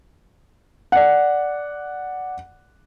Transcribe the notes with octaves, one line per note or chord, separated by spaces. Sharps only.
D5 F#5